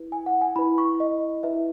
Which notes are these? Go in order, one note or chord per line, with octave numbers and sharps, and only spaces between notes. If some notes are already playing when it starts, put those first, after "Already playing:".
Already playing: E4 B4
G#5
F#5
G#5
E4 B4 B5
C#6
D#5
E4 B4 E5